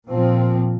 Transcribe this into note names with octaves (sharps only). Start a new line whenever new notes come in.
A#2 F3 C4